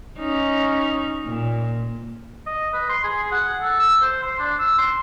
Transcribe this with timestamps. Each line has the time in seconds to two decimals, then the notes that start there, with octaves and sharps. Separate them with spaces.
0.19 C#4 D#4
1.25 A#2
2.46 D#5
2.73 B4
2.89 C6
3.04 G#4
3.32 F#5
3.61 A4
3.79 E6
4.01 C5
4.23 C6
4.39 D4
4.59 E6
4.78 C6